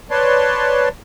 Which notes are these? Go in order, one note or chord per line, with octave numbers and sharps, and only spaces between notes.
B4 C#5 D5 A5 C6